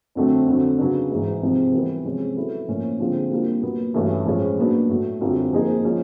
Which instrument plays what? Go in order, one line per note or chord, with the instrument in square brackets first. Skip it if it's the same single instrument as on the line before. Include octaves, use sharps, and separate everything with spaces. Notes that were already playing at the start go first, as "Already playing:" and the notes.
[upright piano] F2 D3 F#3 A3 C4
F2 D3 F#3
C#3 F#3 B3 D4
G#2 E3 G#3
C3 F3 G#3 C4 D#4
E3 G3 B3
C3 F3 G#3 C#4
F#3 B3 E4 A4
A2 F3 A#3 C#4
D3 F3 G#3 C4 F4
G3 A#3 D4 F4
A#2 F#3 B3
G2 E3 A3 C#4 F#4
A2 F3 G#3 C#4 F4
A#2 F#3 B3 D4
A2 F#3 A3
F#2 D3 G3 C4 F4
F3 A#3 D#4 G#4 C5
F3 G#3 C#4 F4